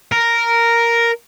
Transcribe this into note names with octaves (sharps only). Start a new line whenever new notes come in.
A#4